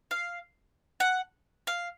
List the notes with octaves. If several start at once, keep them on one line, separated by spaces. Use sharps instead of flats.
F5
F#5
F5